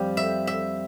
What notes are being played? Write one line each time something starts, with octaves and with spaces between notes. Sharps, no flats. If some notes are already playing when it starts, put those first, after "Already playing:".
Already playing: F2 G3 G4
E5
E5